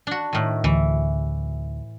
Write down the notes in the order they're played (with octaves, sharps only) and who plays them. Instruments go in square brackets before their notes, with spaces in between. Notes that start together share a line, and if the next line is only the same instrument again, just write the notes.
[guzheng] D4 F#4
A2 D#3
[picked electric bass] D2 [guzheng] E3